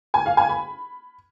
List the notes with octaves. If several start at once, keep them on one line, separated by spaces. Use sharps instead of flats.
G#5
F5
G#5
B5